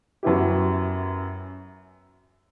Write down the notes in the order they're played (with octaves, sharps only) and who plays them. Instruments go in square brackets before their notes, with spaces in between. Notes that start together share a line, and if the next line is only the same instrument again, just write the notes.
[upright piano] F#2 F#3 B3 E4 G4